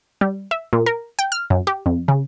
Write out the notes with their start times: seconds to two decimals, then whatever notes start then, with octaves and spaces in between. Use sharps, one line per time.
0.21 G3
0.51 E5
0.73 A#2
0.86 A#4
1.19 G5
1.32 F6
1.50 F#2
1.67 G4
1.86 F2
2.08 C#3